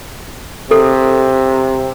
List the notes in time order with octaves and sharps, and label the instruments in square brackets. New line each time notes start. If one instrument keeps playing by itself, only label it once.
[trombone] C3 [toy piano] A4